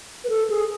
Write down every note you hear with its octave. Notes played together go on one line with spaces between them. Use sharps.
B4
A4
G#4